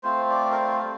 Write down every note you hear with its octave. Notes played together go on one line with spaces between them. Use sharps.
A3 C4 F4 C5
D5
A#4
C5
G3